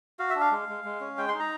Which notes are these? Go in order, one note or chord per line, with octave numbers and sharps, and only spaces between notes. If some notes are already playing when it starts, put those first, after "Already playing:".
F#4 F5
E5
D4
F5
G#3
G#3
G#3
C#4
G#3 G5
C6
D#4
A#5